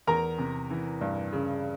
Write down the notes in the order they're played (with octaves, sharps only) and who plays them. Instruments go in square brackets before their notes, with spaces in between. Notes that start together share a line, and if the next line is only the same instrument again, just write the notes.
[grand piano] E2 A#4 A#5
C3
E3
G2
C#3